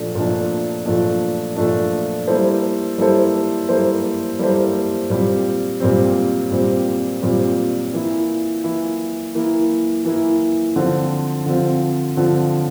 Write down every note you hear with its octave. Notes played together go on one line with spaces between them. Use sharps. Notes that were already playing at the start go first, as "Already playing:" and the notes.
Already playing: A#2 F3 A3 D4
A#2 F3 A3 D4
A#2 F3 A3 D4
A#2 F3 A3 D4
G3 A#3 E4 A4 C5
G3 A#3 E4 A4 C5
G3 A#3 E4 A4 C5
G3 A#3 E4 A4 C5
A#2 G3 C4
A#2 G3 C4
A#2 G3 C4
A#2 G3 C4
E3 A#3 E4
E3 A#3 E4
E3 A#3 E4
E3 A#3 E4
D3 F3 C4 F4
D3 F3 C4 F4
D3 F3 C4 F4